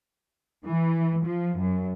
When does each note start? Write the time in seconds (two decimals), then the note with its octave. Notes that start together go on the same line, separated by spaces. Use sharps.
0.67 E3
1.25 F3
1.58 F#2